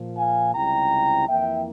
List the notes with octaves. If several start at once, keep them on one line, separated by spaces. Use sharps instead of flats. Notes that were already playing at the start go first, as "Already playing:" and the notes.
Already playing: A#2 F3 A#3
F5 G#5
C#2 C3 G3 C4 E4 G5 A#5
F2 E3 A#3 E4 E5 G5